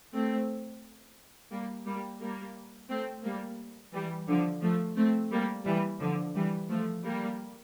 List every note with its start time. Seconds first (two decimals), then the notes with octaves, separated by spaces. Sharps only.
0.13 A3 C4
1.51 G3 A#3
1.86 G3 A#3
2.21 G3 A#3
2.89 A3 C4
3.23 G3 A#3
3.93 E3 G3
4.28 D3 F3
4.61 F3 A3
4.96 A3 C4
5.32 G3 A#3
5.65 E3 G3
6.00 D3 F3
6.35 E3 G3
6.69 F3 A3
7.03 G3 A#3